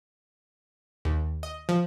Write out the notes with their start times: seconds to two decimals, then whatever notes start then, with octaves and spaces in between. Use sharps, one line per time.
1.05 D#2
1.43 D#5
1.69 F3